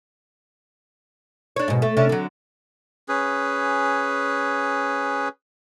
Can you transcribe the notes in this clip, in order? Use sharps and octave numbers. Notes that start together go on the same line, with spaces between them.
D4 C#5
G#2 B2
A3
C3 C#4 D4
D3 F#3
C#4 G#4 B4